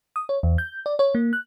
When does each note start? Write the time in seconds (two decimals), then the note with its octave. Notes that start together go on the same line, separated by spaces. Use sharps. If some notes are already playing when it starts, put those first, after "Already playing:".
0.16 D#6
0.29 C#5
0.43 E2
0.58 G6
0.86 D5
0.99 C#5
1.15 A#3
1.33 F#6